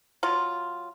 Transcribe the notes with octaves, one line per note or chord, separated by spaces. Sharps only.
F#3 F4